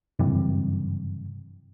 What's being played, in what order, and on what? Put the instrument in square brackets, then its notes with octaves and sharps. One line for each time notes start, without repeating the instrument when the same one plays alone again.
[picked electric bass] F#1 G2 C3 E3